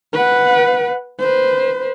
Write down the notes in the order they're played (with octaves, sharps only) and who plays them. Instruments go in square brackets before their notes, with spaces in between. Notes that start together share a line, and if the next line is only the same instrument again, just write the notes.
[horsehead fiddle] B4 F#5
B4 C5